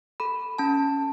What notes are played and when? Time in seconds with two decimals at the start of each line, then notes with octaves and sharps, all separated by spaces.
0.20 A4 B5
0.58 C#4 A5